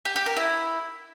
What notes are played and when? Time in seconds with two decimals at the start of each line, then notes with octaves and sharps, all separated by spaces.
0.05 G4
0.16 G4
0.26 A#4
0.37 E4